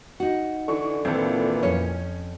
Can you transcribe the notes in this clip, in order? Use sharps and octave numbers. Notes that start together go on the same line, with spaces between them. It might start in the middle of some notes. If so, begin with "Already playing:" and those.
D#4 F#4
D3 E3 C#6
G#1 A#2 E3 C4 A4
F2 C#4 C#5